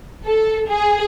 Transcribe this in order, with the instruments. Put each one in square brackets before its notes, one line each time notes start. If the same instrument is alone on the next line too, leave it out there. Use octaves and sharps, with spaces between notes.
[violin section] A4
G#4